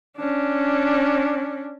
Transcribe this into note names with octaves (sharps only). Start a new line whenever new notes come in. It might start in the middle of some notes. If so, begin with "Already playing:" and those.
C#4 D4